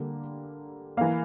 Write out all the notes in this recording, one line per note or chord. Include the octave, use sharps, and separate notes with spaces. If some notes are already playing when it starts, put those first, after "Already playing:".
Already playing: D3 G3 A#3
E3 A#3 F5